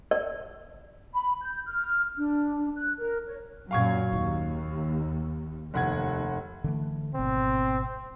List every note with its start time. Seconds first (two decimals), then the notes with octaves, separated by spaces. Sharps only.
0.11 D5
1.14 B5
1.41 G6
1.67 F6
2.18 D4
2.76 F#6
2.98 A#4
3.26 C#5
3.71 F#2 A#2 F#3 F5 C#6 G#6
4.12 D#2 D#3
5.74 F1 D#2 F#5 G#6
6.64 D3 E3 A3
7.15 G#1 B2 C4